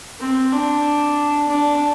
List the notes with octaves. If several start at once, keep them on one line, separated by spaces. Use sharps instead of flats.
C4
D4
D4